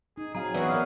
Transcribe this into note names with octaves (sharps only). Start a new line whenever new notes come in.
D#4 G#4
F#3 C4 G#4 F5 A#5
E3 B3 F#4 B4 D5 F#5
B3 A#4 F5